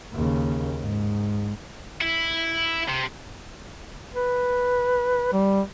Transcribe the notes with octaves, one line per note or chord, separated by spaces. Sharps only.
D#2 C#3
G#2
E4
C3
B4
G3